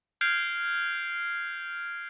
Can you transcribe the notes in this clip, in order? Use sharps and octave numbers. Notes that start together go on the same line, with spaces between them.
F6 G6 G#6 C7 D7 F7